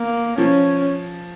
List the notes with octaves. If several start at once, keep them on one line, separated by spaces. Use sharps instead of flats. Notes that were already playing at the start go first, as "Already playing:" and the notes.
Already playing: A#3
F3 C#4